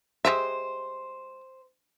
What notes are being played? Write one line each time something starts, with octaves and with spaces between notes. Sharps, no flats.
G#3 G4 C5 E5